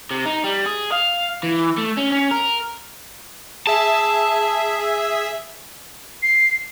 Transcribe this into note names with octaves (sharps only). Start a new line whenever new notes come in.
C3
D#4
G3
G#4
F5
E3
A3
C#4
C#4
A#4
G#4 E5 A5
C7